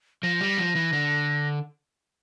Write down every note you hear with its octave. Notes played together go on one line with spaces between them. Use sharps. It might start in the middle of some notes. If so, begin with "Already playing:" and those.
F3 A#6
G3
F3
E3
D3